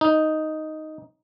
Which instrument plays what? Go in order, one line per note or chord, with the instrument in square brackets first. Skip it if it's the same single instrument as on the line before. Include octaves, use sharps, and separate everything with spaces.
[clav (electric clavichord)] D#4